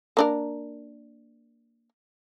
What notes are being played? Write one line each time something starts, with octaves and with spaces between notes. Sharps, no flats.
A#3 D4 A#4